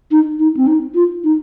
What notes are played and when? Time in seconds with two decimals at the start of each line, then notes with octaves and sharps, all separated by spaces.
0.11 D#4
0.39 D#4
0.57 C4
0.67 D#4
0.95 F4
1.24 D#4